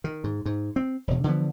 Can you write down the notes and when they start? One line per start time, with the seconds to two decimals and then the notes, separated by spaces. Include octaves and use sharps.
0.04 D#3
0.24 G#2
0.46 G#2
0.76 C4
1.07 E1 B2
1.24 D3 E3 F3 B3